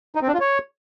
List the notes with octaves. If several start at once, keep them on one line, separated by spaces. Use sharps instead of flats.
D#4
C4
D4
F4
C#5